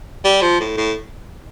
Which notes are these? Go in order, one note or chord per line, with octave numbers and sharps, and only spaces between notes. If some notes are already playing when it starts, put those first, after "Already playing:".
G3
F3
A2
A2